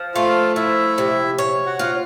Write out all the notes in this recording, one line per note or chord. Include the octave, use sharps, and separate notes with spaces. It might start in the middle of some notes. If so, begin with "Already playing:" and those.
Already playing: F3
A3 F4 F5
F3 E4 E5
C3
C#5
F#4 F#5
F4 F#5